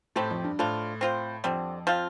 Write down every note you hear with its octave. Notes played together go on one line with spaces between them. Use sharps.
A2 A3 C4 G4
F2
G2
A2 F3 D4 F4
C4 F4 C5
F2 D3 G3 C4
F3 C4 F4